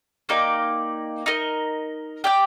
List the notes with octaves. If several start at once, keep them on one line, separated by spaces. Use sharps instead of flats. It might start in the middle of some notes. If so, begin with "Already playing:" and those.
A#3 D#4 G4 D5
D#4 A#4 D#5
G4 D5 G5